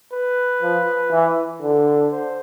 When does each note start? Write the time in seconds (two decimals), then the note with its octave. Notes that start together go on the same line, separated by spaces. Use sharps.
0.12 B4
0.62 F3
1.12 E3
1.62 D3
2.11 C5